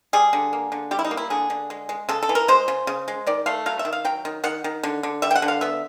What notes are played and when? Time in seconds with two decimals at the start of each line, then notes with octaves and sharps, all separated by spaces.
0.13 G3 G#4
0.33 D3
0.53 A#3
0.72 D3
0.91 G3 G4
0.99 E4
1.04 D#4
1.11 A#3
1.17 E4
1.30 D3 G#4
1.50 D3
1.70 G#3
1.89 G#3
2.09 C#3 A4
2.23 A4
2.29 E3
2.35 A#4
2.48 G#3 C5
2.68 C#3
2.87 C#3
3.08 G#3
3.27 D#3 D5
3.46 A3 F5
3.66 F#3 F5
3.79 E5
3.85 D#3
3.93 F5
4.05 F#3 G5
4.25 D#3
4.44 D#3 F#5
4.64 D#3
4.83 D3
5.03 D3
5.22 G3 E5
5.31 G5
5.35 F#5
5.42 D3
5.48 F5
5.61 B3 E5